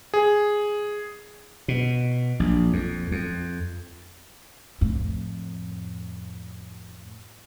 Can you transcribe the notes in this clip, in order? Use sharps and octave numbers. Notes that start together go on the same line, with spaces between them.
G#4
B2
A#1
F2
F2
F2 A2